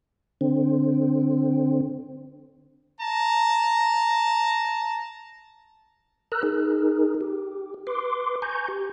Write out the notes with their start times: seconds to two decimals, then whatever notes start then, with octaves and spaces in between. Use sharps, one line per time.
0.41 D3 C4
3.01 A5 A#5
6.32 A#4 A#5 E6 F#6
6.43 D#4 G#4 A#4
7.21 G4
7.87 B4 C6 D6
8.42 G#5 A#5 C#6 G6
8.68 G4